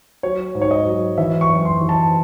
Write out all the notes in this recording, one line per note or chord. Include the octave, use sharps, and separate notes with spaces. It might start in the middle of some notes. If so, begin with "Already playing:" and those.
F#3 C#5
G#2
C#5
D#5
F#3
E3 E5
C#6
F#2
C6
E3
A5